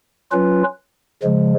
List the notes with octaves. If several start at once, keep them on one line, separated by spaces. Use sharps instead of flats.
F#3 C#4 F4 B4
C#3 F3 G#3